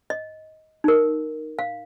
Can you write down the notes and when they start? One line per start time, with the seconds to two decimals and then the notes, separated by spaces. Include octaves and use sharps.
0.10 D#5
0.84 D#4 A#4
1.59 F5